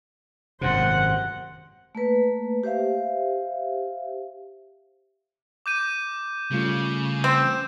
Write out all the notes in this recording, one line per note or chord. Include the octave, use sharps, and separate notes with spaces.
G#1 F#2 C3 C5 F#5
A3 A#3 B4
G4 C5 E5 F5
D6 G6 D#7
C#3 G3 A3 F4
C4 E7